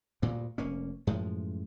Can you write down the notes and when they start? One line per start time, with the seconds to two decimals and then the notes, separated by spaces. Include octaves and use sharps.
0.22 D2 G2 A#2
0.58 F1 A#3 C#4
1.07 F#2 A2 F3 G#3